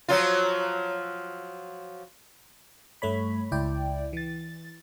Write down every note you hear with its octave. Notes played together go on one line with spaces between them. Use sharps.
F3 F#3 F4
G2 A3 C#5 B5
C#2 E4 D5 G5
E3 A6